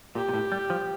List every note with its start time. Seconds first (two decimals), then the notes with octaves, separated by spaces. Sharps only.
0.15 A#2 G4
0.29 A#2
0.34 A2
0.52 G3
0.70 F3